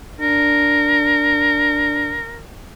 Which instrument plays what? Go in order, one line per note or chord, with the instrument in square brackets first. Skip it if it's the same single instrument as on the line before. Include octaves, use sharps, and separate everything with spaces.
[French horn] D4 [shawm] A#4